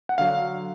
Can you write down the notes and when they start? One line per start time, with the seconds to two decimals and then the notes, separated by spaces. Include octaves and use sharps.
0.09 F#5
0.18 D3 F#3 F5